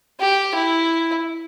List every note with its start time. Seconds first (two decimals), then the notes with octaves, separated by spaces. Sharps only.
0.20 G4
0.55 E4